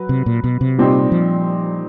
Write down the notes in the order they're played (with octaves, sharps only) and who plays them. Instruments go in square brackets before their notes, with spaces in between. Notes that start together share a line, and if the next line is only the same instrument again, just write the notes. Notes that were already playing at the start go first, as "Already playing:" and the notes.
Already playing: [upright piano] F#3 B4
[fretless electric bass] C3
A#2
B2
C3
[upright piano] A#2 G3 C4 D#4 G4
[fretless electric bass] F3